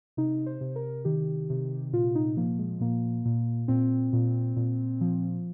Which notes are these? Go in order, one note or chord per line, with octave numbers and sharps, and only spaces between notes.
C3 D#4
C5
C3
A#4
D#3 G4
C3
A#2 F4
D#4
F3 A#3
G#3
A#2 A#3
A#2
A#2 C4
A#2
A#2
F3